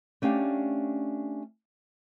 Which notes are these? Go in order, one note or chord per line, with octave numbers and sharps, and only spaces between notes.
A3 C#4 D4 G4 F5